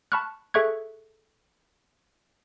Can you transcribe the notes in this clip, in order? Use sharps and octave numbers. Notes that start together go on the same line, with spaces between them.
A5 B5 C#6 F6 F#6
G#4 A4 E5 C#6 F#6 G#6